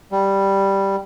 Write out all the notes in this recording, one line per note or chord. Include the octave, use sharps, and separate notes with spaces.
G3